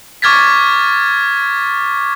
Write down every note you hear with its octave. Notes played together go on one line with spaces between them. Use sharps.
C#6 D6 F6 G#6 A6 B6